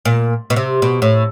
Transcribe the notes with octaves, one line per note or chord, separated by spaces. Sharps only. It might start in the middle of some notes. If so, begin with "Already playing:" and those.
A#2
B2
C3
B2
A2